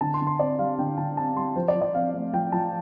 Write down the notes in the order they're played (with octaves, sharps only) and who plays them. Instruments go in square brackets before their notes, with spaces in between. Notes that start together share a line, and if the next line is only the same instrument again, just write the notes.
[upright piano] D3 A5
C6
D3
C6
C4 D5
G3 F5
D3 G5
D3 A5
C4 A5
G3 C6
F3 C5
D5
F3
D5
C4 F5
A3
F3 G5
F3 A5